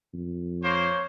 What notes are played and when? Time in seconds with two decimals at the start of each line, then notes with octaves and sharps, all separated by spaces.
0.14 F2
0.64 A#3 C5 C#5